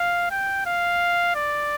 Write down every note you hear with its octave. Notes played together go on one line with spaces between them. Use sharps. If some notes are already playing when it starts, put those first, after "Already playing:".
Already playing: F5
G5
F5
D5